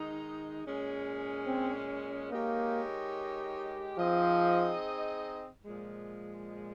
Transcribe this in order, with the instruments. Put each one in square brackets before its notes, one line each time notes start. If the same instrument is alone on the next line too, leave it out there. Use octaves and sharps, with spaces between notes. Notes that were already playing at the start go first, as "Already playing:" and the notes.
Already playing: [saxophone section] D#3 G#3 D#4
A#2 G#3 C#4 G#4
[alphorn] C4
[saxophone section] G#3 D#4 G4 A#4 C#5 [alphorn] A#3
[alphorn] F3 [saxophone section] C4 D#4 G#4 D#5
[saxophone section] A#2 F3 G#3